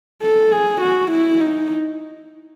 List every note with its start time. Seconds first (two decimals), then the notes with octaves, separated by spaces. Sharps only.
0.22 A4
0.52 G#4
0.81 F#4
1.11 E4
1.41 D#4